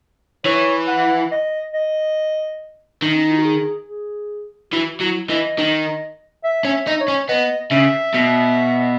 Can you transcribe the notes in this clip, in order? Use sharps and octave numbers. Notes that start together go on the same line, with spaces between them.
E3 C#5
F#5
D#5
D#5
D#3
C#4
D#4
E4
F#4
G#4
G#4
E3 F#4
F#3 E4
E3 D#5
D#3
E5
C#4
E5
D#4
C#5
C#4
B3 D#5
C#3 E5
B2